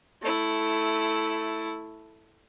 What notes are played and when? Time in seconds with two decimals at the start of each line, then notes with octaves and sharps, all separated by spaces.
0.22 A3 E4